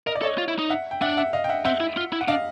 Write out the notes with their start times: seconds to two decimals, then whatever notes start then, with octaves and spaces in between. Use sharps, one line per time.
0.07 A#4 D#5
0.15 D5
0.22 A4 C#5 D#5
0.38 F4
0.48 E4
0.59 D#4
0.70 E5 F#5
0.91 G5
1.01 D4 E5 F#5
1.17 E5 F#5
1.33 D#5 F5
1.44 G5
1.49 E5 F#5
1.65 C4 E5 F#5
1.80 E4
1.97 F4
2.13 E4
2.21 F#5
2.28 D4 D#5 F5